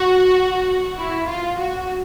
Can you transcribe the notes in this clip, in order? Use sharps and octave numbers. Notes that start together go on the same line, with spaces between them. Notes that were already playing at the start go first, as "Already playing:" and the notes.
Already playing: F#4
E4
F4
F#4